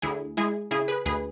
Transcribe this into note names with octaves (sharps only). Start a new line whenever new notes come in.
D2 E4 G#4
G#3 E4 G#4
C#3 E4 G#4
G#4 B4
D2 G#4 B4